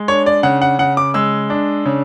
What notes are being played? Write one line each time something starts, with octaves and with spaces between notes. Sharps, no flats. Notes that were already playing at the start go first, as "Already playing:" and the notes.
Already playing: G#3
D4 C#5
D5
C#3 F#5
F#5
C#3 F#5
D6
G#3 E6
D4
C#3